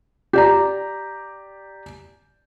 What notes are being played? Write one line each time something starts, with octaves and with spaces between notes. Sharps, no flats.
G4 D5 A#5